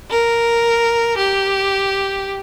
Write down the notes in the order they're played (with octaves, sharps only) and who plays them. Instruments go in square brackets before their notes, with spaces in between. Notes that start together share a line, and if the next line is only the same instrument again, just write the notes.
[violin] A#4
G4